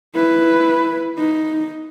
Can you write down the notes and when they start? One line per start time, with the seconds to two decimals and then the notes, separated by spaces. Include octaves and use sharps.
0.15 E4 B4
1.18 D#4